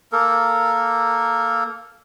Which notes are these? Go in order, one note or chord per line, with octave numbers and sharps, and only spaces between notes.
A#3 A4 A#4